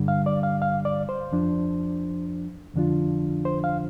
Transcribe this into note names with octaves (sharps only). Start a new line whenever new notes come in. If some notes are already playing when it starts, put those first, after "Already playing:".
Already playing: G2 D3 G3
F5
D5
F5
F5
D5
C5
F2 F3 D4
F2 D3 F3 D4 F4
C5
F5